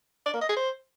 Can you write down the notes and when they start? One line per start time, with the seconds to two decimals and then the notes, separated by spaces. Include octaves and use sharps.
0.26 D5
0.33 A#3
0.41 D#5
0.49 G#4
0.57 C5